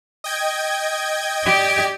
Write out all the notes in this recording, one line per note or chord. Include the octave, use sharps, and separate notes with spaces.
D#5 G5 G#6
G4 D5